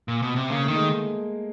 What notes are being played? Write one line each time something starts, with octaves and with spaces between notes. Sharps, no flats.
A#2
B2
C3
C#3 A#3
A3
D#3
G#3